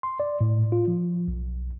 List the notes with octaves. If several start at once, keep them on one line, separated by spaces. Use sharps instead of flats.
C6
D5
A2
F4
F3
B1